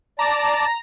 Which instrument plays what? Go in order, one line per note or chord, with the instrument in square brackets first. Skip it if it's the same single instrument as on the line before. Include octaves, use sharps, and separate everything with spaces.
[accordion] D5 A5 [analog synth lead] A#5